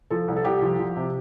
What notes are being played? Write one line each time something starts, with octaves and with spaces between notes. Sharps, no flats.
F3 A4
C2
A4
C2 G4
F3
F3
C3